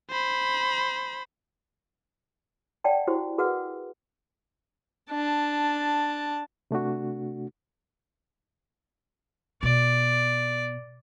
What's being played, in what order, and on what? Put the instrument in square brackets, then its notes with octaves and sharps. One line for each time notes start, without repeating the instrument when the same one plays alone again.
[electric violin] C5 B5
[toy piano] D5 F#5 G5 A5
E4 F#4 G4 C5
F#4 G#4 A#4 B4 F#5
[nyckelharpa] D4 A5
[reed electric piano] C3 A3 D4 F#4
[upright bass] B2 [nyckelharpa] D5